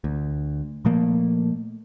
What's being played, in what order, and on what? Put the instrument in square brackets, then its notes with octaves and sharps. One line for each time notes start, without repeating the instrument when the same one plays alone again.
[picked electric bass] D2
A#2 F3 A3 A#3